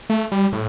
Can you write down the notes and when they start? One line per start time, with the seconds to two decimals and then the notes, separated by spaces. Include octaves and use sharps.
0.10 A3
0.32 G3
0.53 A2